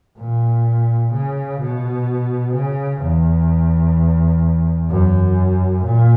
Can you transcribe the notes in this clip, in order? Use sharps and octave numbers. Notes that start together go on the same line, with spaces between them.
A#2
C#3
B2
C#3
E2
F#2
A#2